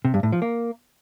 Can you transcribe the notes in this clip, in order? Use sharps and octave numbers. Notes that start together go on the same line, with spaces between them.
C3
G2
A2
F3
A#3